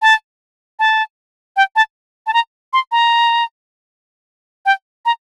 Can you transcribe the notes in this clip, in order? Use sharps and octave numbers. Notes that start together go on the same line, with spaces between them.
A5
A5
G5
A5
A5
A#5
C6
A#5
G5
A#5